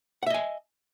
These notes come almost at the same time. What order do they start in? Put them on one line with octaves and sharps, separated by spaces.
F#5 E5 D#5 G#5